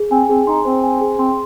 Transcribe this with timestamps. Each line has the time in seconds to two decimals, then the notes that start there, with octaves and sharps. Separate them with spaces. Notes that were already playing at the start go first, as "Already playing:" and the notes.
Already playing: G#4
0.11 C4 G#5
0.29 C4 G#4
0.47 D#4 C6
0.65 C4 C5
0.83 G#5
1.01 G#4
1.19 C4 C6